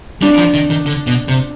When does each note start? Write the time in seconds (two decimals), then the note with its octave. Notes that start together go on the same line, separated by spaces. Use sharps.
0.22 G3 D4
0.38 F3
0.54 D#3
0.70 D#3
0.86 D3
1.07 B2
1.28 C3